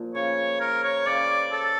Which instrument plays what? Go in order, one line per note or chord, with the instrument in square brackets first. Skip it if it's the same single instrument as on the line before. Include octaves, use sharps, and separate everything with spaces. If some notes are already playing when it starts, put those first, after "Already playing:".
Already playing: [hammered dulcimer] A#2 F3
[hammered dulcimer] C#3 [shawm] C#5
[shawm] A#4
C#5
[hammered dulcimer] C#3 [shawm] D5
[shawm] A4